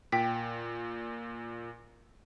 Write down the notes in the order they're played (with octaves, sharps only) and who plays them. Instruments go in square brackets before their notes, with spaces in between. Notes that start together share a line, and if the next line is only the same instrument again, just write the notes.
[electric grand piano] A#2 [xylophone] G5 B6